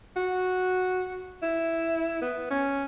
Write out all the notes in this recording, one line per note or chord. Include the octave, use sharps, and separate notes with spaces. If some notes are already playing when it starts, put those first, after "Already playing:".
F#4
E4
B3
C#4